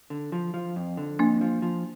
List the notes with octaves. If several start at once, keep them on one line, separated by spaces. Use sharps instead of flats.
D3
F3
F3
F2
D3
F2 A#3 D4
F3
F3